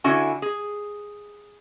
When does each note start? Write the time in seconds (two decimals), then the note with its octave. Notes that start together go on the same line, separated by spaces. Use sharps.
0.04 D3 C#4 E4 F#4 G#5
0.42 G#4